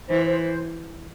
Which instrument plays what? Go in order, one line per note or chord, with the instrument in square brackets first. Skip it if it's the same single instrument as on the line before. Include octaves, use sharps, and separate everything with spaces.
[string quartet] E3 [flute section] C5
[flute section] C5
C5